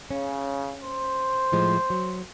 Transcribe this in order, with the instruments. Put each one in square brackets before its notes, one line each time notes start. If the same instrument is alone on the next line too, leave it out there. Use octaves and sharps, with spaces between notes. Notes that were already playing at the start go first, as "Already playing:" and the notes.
[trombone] C#3 [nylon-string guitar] C#4
[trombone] C5
[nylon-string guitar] A2 F3 G#3
F#3